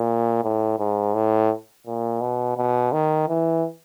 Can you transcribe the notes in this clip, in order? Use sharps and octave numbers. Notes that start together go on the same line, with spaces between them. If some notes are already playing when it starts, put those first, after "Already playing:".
Already playing: A#2
A2
G#2
A2
A#2
B2
B2
D#3
E3